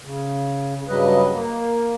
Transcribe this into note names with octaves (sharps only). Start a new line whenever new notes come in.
C#3
G2 C#3 F#3 G3 B4 D#5
A#3